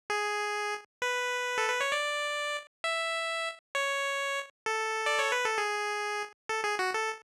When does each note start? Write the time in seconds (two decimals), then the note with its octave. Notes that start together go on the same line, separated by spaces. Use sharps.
0.10 G#4
1.02 B4
1.58 A4
1.69 B4
1.81 C#5
1.92 D5
2.84 E5
3.75 C#5
4.66 A4
5.06 D5
5.19 C#5
5.32 B4
5.45 A4
5.58 G#4
6.49 A4
6.64 G#4
6.79 F#4
6.94 A4